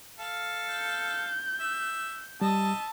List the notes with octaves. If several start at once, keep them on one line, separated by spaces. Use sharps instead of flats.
A4 F5
G6
E5
G3 D#5 E5 A5